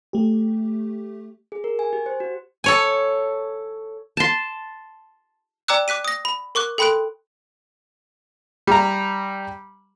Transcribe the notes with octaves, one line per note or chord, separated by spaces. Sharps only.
A3 G4
G#4
A#4
G#5
G4
C5
F#4
A4 C#5 G#5
A5 C6
D5 G5 A#5 D6 E6 F#6
D6 F#6 B6 D#7
D#6 A#6
B5
A#4 C#6 D6 F#6
A4 G5 B5 C6 F#6 D7
G3 A#5